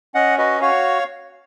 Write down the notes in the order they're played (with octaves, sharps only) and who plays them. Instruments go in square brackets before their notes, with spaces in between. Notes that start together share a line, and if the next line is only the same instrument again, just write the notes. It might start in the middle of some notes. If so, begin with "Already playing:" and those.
[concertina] C#4 D#5 F#5
F#4 B4 D#5
F#4 C#5 F5